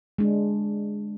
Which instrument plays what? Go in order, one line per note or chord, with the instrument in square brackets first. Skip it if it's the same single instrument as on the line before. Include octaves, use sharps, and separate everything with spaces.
[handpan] G#3 D4